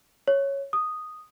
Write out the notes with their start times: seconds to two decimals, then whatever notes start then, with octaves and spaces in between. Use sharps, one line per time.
0.28 C#5
0.73 D#6